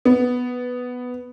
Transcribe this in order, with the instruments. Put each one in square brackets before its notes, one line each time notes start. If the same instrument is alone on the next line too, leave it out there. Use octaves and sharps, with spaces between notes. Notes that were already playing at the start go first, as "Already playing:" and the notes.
[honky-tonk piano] B3